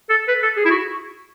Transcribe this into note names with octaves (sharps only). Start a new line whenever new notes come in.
A4
B4
A4
G#4
E4
F#4